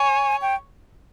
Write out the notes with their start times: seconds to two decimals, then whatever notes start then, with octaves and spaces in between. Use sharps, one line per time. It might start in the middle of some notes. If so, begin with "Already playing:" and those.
Already playing: C#5 G#5
0.42 G5